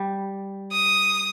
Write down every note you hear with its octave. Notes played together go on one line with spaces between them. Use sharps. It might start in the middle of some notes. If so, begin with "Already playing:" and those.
Already playing: G3
D#6